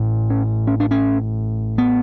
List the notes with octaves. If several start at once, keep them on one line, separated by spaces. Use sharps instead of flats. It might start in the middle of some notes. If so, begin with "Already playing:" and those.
Already playing: A1 A2
C#4
C#4
D4
C#4
B3